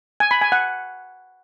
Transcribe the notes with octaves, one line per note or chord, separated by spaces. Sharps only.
G#5
B5
G#5
F#5